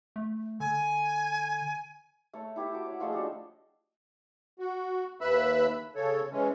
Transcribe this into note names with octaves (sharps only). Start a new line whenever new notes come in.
A3
D3 G#5
A3 C#5
E4 G4 E5 G5
F#4 D6
C#5 F#5
F3 A3 G#4 D#5
D4 F#4 G4 A4
F#4
D#2 B4 E5 B5 E6 F#6
C#3 A4 C#5
E3 G#3 C#4